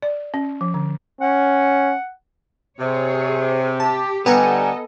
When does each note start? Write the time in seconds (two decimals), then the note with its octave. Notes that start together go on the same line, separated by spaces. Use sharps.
0.02 D5
0.34 C#4
0.61 F3
0.74 D3
1.21 C#4 F#5
2.80 C3 G#4 C#5
3.80 G4 A5
4.26 D3 G3 B3 A4 D#5 F#5 G#5 A#5